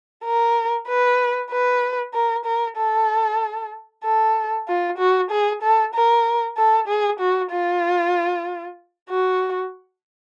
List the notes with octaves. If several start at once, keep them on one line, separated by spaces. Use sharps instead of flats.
A#4
B4
B4
A#4
A#4
A4
A4
F4
F#4
G#4
A4
A#4
A4
G#4
F#4
F4
F#4